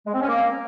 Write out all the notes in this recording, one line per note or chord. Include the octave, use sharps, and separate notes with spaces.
G#3
C4
C#4
A#3